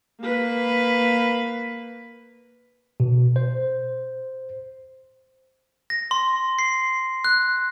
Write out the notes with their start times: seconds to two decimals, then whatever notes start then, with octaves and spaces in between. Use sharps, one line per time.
0.21 A#3 B4
3.00 B2
3.36 C5
5.90 A#6
6.11 C6
6.59 C7
7.25 F#6